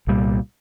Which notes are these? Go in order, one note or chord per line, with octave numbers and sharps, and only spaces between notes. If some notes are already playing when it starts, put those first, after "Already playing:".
C2 A#2 G3